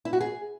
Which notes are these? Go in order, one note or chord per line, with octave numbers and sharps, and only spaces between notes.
E4
F#4
G#4